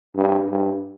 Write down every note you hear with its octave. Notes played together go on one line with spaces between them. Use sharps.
G2
G2